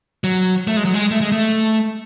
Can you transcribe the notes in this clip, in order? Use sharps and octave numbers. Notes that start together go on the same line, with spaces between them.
F#3
A3
G#3
F#3
G#3
A3
G#3
A3